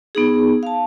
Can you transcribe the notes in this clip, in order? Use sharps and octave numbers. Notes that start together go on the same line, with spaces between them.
B3 D#4 G#4
F5 A5